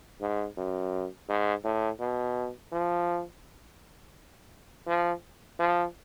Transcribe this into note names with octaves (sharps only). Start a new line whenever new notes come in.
G#2
F#2
G#2
A2
B2
F3
F3
F3